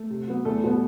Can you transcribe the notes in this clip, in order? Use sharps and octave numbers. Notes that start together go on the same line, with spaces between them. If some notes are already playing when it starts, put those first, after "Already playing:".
Already playing: A3 A4
C3
F#3 B3
E2 A3 A4
B2 G3 B3